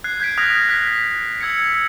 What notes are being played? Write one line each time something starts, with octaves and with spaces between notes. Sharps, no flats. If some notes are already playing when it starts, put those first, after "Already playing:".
F#6 G#6 C7
G6 G#6 B6 D7
D#6 F6 F#6 G#6 A#6 F7
F#6 B6
E6 G#6 B6 C#7